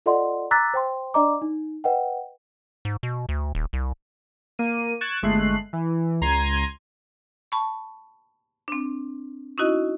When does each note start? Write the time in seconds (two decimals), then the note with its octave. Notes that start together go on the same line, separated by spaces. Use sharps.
0.06 F4 A4 D5 D#5 F#5 C6
0.51 A#5 D6 E6 F#6 A6 B6
0.74 C5 G5 C6
1.14 D4 D5 D#5 A#5 D6
1.42 D#4
1.84 B4 D#5 F#5 G5
2.85 G#2
3.03 B2
3.29 D2
3.55 D#1
3.73 C2
4.59 A#3 D#7
5.01 C#6 F#6 G#6 A6 D7 E7
5.22 G1 G#3 A3 F#6 C7
5.73 E3
6.21 C#2 A#5 C6 G#6 D#7
7.52 A5 B5 C#6
8.68 C4 D4
9.58 C#4 D#4 E4 F#4 D#5